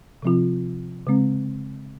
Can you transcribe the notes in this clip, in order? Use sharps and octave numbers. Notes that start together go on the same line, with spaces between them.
C3 F3 C4 F4
C#3 G#3 C4